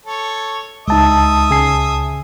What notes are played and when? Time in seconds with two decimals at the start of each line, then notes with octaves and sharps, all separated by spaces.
0.05 A4 C#5
0.88 C#2 G#3 D#4 E5 A5 D#6
1.51 C#3 G#5 C7